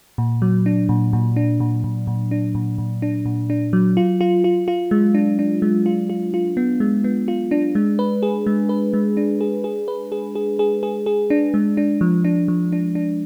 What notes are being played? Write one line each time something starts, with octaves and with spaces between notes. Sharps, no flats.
A#2
F#3
D4
A#2
A#2
D4
A#2
A#2
A#2
D4
A#2
A#2
D4
A#2
D4
F#3
F4
F4
F4
F4
G#3
D4
D4
G#3
F4
F4
F4
B3
G#3
B3
F4
D4
G#3
B4
G#4
G#3
B4
G#3
D4
G#4
G#4
B4
G#4
G#4
G#4
G#4
G#4
D4
G#3
D4
F3
D4
F3
D4
D4